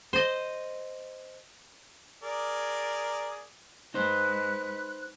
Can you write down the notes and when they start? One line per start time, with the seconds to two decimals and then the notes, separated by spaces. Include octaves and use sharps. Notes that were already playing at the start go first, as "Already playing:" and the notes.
0.13 C5 D#5
2.23 G#4 A#4 D5
3.94 G#3 D#4 B4 C5 F#6